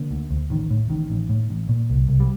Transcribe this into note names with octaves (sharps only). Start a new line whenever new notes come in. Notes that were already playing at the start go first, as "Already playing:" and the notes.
Already playing: D3 A#3
D2
D2
A1 D#3
A2
A1 D#3
A1
A2
A1
A#2
C2
C2
G3